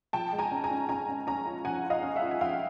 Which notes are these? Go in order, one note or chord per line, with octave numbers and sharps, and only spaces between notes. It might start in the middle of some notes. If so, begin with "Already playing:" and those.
F3 G5 A5
G#3
G#5 A#5
C#4
G#5 A#5
C#4
C#4 G#5 A#5
C#4
C#4 G#5 A#5
F4
F3 F#5 G#5
F4
D#5 F5
C#4
E5 F#5
F4
G#5
F3 F5 G5